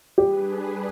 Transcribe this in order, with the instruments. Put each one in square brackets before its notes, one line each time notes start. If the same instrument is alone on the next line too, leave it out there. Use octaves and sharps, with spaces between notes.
[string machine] G3 D4 G#4 B4 [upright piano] G4